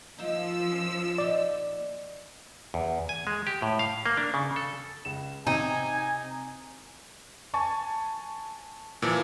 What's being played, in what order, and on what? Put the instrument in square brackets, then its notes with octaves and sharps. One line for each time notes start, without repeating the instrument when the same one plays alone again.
[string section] F3 E6 [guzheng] A#3 D#4
[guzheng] C#4
[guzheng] A#2 D#4 [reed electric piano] D5
[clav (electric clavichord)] E2
G#5
G#3
G4
A2
F5
A#3
D4
C#3
A4
[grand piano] C#2 E7
[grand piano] C3 C4 [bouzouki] D#4 [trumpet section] G#5
[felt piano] G#5 A5 C#6
[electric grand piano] A#2 E3 F3